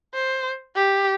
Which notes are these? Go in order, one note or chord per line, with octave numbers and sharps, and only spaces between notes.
C5
G4